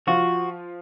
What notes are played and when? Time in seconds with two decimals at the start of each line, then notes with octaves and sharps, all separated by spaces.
0.07 F3 F4 F#4